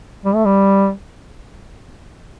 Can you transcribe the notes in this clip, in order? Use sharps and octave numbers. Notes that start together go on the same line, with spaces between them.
G3
A3
G3